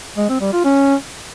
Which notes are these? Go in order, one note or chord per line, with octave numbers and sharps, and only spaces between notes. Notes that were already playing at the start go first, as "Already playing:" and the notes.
G#3
C4
G3
F4
C#4